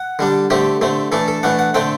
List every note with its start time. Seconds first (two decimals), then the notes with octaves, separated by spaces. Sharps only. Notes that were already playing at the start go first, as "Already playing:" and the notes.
Already playing: F#5
0.19 D3 G3 D4
0.50 D3 A3 C4 G4
0.81 D3 A3 C4
1.12 E3 A3 D4 A4
1.28 A4
1.43 E3 A3 D4 F#5
1.59 F#5
1.74 D3 A3 C4 G5